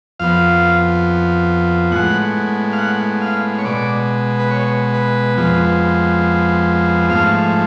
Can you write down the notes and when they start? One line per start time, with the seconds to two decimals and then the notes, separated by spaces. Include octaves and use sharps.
0.20 F2 F3 B3 F5
1.92 A2 G#3 B3 F#5
2.73 F5
2.78 F#5
3.22 F5
3.59 C#5
3.65 B2 G#3 B3 D5
4.40 B4
4.51 C#5
4.94 B4
5.37 F2 F3 G#3 B3
7.10 G#2 F3 A3 F5